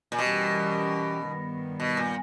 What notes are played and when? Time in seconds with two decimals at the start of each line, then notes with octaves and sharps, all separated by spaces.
0.12 A#2
0.18 B2 E3 G3 C#4 G4 A#4
1.26 G2 D#3 G3 B3
1.80 B2
1.97 A#2